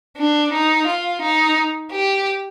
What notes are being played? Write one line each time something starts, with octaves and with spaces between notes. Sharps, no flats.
D4
D#4
F4
D#4
G4